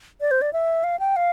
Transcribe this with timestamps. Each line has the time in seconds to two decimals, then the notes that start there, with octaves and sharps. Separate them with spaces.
0.21 D5
0.31 C5
0.41 D5
0.53 E5
0.84 F5
0.99 G5
1.16 F5